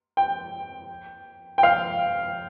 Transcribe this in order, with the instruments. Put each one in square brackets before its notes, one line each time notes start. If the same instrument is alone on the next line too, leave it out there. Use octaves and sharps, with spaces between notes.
[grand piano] G5
G5
F5